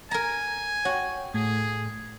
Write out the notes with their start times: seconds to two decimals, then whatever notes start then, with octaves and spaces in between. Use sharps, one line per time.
0.11 A#4 G#5 A#5
0.85 F#4 C#5 F#5 G5
1.34 A2 A3 G#4 G#6